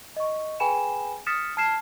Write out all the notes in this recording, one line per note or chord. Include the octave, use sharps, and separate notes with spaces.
D#5 C#6
G#4 B4 G5 G#5 B5 E7
D#6 F6 A6 B6 C#7 E7
A5 F6 G#6 C7 E7